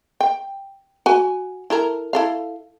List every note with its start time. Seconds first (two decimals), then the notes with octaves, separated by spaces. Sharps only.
0.21 G5
1.06 F#4 G#5
1.70 E4 A4 A#4
2.13 E4 A4 F5